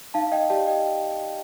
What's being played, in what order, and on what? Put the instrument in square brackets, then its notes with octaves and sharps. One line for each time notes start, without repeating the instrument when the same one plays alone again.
[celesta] D#4 F5 A5
F5
D#5 G5
G4 D5 F5 A5
D#5 G5